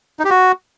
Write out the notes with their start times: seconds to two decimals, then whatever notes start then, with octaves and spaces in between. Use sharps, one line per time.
0.19 D#4
0.25 G4
0.30 F#4